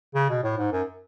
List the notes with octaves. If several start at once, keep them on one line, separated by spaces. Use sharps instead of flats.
C#3
B2
A2
G#2
F#2